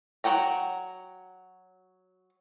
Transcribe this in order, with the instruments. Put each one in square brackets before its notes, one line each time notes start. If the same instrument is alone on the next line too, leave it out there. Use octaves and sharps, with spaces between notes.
[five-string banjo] F#3 F#5 G5 A#5